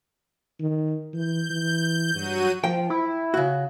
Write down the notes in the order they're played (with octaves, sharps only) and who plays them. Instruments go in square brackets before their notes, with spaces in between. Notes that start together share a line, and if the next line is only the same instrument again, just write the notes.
[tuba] D#3
[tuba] E3 [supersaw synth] G6
[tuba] E3
[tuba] G2 [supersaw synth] F#3 F#4 D#7
[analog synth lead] F3 [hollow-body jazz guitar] G5
[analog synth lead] E4
[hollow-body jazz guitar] C#3 F#4